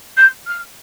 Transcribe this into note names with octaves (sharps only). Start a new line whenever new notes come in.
G6
F6